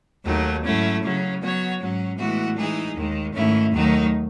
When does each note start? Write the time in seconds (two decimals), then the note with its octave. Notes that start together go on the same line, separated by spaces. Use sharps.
0.25 D#2 D#3 F#3 A3 D#4
0.64 G#2 F#3 A3 C#4 E4
1.03 C#3 F#3 C#4
1.41 F#3 B3 F#4 C#5
1.80 G#2 F#3 C#4
2.18 A2 E3 G#3 B3 F#4
2.57 E3 G#3 D#4 G#4
2.95 D#2 D#3 G#3
3.34 G#2 D#3 A3 C#4 E4
3.73 D#2 D#3 F#3 A3 D#4